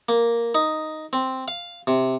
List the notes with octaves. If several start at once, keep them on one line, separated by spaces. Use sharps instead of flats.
A#3
D#4
C4
F5
C3